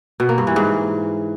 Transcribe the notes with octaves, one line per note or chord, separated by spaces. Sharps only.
B2
A#3
G2
E3
G#2